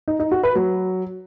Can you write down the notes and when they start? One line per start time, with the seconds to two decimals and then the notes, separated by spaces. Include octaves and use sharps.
0.08 D#4
0.20 D#4
0.31 F#4
0.43 B4
0.55 F#3